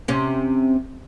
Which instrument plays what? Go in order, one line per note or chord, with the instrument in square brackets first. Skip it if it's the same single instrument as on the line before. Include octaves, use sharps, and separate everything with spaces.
[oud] C3 C#4